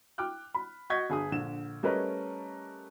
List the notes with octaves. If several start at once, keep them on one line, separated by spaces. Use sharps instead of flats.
G5 D6 F6 F#6
B5
F#4 D#5 C#6 G6 G#6 B6
G1 G#4 D#6
A#1 D3 E7
G3 A3 C#4 A#4 B4 D#5